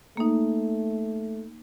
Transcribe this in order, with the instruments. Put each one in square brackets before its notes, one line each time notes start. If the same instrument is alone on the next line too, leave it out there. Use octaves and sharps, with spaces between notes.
[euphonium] A3 [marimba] A#3 D#4